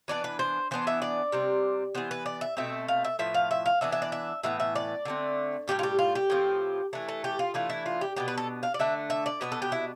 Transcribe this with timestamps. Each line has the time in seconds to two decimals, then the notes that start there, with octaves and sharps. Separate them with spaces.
0.08 E3 B3 D4 D5
0.24 B4
0.39 C5
0.71 E3 B3 D4 C5
0.87 E5
1.02 D5
1.32 C3 G3 C4
1.95 E3 G3 B3 C5
2.11 B4
2.26 D5
2.41 E5
2.57 B2 A3 C4 E5
2.88 F5
3.05 E5
3.19 A2 F3 B3 E5
3.34 F5
3.51 E5
3.66 F5
3.81 E3 B3 D4 E5
3.92 E5
4.02 D5
4.12 E5
4.43 A2 E3 B3 E5
4.60 E5
4.75 D5
5.05 D3 A3 C4
5.68 A2 E3 G3 G4
5.79 F4
5.83 G4
5.99 F4
6.15 G4
6.30 A2 F3 C4
6.93 E3 A3 D4
7.08 A4
7.24 G4
7.39 F4
7.54 E3 A3 D4 F4
7.70 E4
7.86 F4
8.01 G4
8.16 B2 B3 D4 G4
8.28 B4
8.37 A4
8.63 F5
8.74 D5
8.79 D3 A3 D4 E5
9.10 E5
9.26 D5
9.41 B2 B3 D4 B4
9.52 A4
9.62 G4
9.72 E4